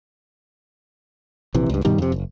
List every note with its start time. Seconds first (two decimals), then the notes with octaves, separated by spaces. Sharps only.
1.54 A#1 C3 E3
1.70 C#2 G2
1.85 G2 B2 D#3 G3
1.98 F2 C3
2.12 F#1